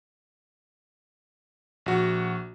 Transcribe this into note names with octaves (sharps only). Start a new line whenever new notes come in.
A#1 F#4